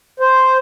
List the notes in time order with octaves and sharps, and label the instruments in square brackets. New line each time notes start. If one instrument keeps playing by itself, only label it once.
[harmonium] C5